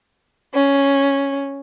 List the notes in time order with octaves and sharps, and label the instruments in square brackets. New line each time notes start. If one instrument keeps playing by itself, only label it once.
[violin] C#4